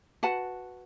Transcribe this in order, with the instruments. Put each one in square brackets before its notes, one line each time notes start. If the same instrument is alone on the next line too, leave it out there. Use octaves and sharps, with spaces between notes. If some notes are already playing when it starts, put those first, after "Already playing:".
[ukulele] F#4 B4 F#5 A5